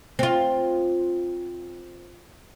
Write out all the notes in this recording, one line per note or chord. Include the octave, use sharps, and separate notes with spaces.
C4 F4